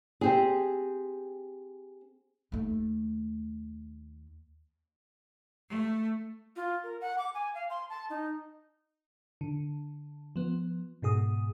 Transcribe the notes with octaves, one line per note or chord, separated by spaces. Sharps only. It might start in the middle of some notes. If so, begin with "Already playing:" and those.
C4 G4 G#4
D#2 A3
A3
F4
A#4
F#5
D6
G#5
F5
C6
A5
D#4
D3
F3 B3
G#2 B2 G#4 D#6